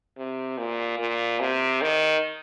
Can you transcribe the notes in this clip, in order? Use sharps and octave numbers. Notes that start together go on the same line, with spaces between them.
C3
A#2
A#2
C3
D#3